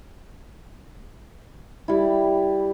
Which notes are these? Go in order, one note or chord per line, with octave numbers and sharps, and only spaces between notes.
G3 E4